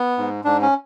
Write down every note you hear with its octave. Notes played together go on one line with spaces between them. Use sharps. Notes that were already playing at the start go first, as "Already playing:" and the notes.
Already playing: B3
G#2
G#2 D4
C#4